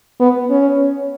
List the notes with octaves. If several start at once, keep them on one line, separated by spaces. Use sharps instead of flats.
B3
C#4